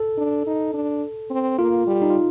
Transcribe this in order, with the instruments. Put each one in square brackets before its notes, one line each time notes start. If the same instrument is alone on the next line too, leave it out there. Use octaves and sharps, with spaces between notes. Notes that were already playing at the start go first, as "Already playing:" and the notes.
Already playing: [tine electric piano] A4
[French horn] D4
D#4
D4
C4
[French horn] A#3 [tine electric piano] F4
[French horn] G3
[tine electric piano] D#4
F4